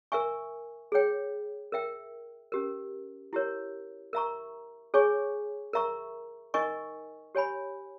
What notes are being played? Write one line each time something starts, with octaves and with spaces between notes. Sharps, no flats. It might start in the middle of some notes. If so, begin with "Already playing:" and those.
A#4 E5 G#5 C#6
G#4 C#5 G5
A#4 E5 G5
C#4 G4 A#4
E4 G4 A#4 C#5
A#4 E5 A#5 C#6
G#4 C#5 G#5 C#6
A#4 E5 A#5 C#6
D#4 A#4 D#5 G#5 C#6
G4 C#5 G#5 B5